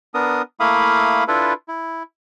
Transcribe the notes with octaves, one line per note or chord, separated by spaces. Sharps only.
B3 D4 A#4 D#6
A3 A#3 E4 F5 B5 D#6
D4 E4 F4 A4 B4
E4